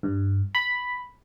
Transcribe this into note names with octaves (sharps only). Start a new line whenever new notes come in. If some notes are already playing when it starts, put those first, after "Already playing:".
G2
B5